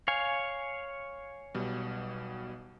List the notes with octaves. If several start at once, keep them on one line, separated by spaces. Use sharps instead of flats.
C#5 F5 G#5
B1 B2 G3